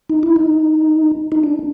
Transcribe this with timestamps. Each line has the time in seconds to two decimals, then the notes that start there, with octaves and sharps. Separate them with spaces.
0.10 D#4
0.23 E4
0.36 D#4
1.32 D#4
1.43 D4